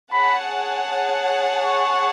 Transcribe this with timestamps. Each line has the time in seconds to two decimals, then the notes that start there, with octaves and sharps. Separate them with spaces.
0.12 G#4 C#5 F#5 A5 B5
1.64 C#6